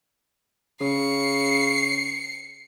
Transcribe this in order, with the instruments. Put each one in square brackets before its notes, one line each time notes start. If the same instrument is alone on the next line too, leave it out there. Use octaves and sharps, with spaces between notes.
[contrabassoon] C#3 [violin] C7 C#7